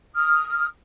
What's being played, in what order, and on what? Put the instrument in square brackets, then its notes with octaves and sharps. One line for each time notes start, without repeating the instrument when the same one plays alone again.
[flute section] D#6 F6